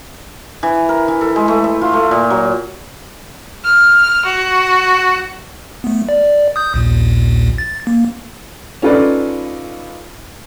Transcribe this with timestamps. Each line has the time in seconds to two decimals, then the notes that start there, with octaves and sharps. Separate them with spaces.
0.63 E3
0.89 A#4
1.08 E3
1.21 A4
1.36 G#3
1.48 A3
1.64 E5
1.81 F4
1.94 A3
2.11 A#2
2.30 F#3
3.65 F6
4.26 F#4
5.84 A3 B3
6.09 D5
6.56 D#6 G6
6.74 A#1 D#2 A#2
7.58 A6
7.87 A#3
8.82 C#4 D#4 F4 A4 B4 D5